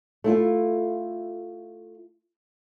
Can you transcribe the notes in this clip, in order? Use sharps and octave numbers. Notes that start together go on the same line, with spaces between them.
A3 E4 F4